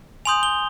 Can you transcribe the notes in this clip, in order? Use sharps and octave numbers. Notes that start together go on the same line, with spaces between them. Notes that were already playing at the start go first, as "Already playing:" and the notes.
G#5 C6 D#6 G6 F7
G7